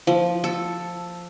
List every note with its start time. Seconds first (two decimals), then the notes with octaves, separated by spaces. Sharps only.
0.07 F3
0.44 A4